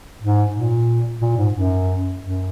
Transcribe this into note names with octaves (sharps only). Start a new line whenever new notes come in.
G#2
A#2
A#2
G#2
F#2
F#2